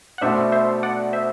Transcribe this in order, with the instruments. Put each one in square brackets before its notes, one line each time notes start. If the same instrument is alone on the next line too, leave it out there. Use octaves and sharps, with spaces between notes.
[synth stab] F#5
[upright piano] B2 A3 D4 F#4 [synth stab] C5 E5
[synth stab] C5 E5
D5 F#5
C5 E5